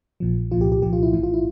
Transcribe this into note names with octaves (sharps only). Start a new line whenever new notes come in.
A#1 A#2 F3
C2 A#2 F3 F4
G4
G4
C2 A#2 F3 G4
F4
E4
A#1 A2 E3 E4
F4
E4